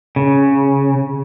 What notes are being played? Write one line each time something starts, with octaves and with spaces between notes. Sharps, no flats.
C#3